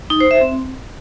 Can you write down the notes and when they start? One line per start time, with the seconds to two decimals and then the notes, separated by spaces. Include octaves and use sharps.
0.10 D#4
0.21 C5
0.31 E5
0.41 C4